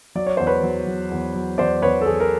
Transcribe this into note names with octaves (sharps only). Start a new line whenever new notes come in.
F#3 D5
C#5
E2 C5
B4 C#5
F#3
F#3
E2
F#3
E2 C5 D5
E2 B4 C#5
A4
E2 G#4
A#4